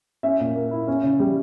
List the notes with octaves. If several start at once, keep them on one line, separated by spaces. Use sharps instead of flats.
C#4 E5
A#2
A#3
E4
C#4
C#3
G3